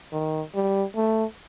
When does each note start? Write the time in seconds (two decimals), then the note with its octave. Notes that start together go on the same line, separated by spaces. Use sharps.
0.13 D#3
0.55 G3
0.96 A3